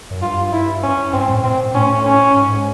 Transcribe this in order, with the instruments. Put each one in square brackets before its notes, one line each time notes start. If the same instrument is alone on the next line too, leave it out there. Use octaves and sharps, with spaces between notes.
[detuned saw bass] F#2
[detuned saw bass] G2 [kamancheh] F4
[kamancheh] E4
C#4
[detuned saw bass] G2 [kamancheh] C4
[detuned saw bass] A2
[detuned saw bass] A#2 [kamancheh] C4
[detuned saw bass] A2 [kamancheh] C#4
[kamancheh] C#4
[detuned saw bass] G#2